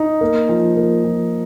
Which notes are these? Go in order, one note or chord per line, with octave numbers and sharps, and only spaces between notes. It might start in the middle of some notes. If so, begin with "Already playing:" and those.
Already playing: D#4
A#3
F3
A#3
F3